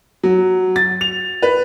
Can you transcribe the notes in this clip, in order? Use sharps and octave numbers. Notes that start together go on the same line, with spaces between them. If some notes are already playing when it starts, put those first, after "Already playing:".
F#3
A6
F7
B4